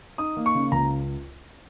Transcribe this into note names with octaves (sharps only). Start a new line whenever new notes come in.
D#4 D#6
A#3
C#6
C#3
C#2 A#5